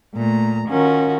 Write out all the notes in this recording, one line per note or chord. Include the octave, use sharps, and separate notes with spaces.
A#2 A3 A#5
D#3 C#4 F4 F#4 A#4